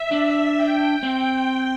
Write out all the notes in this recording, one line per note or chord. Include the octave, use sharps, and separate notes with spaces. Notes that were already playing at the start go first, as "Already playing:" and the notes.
Already playing: E5
D4
G5
C4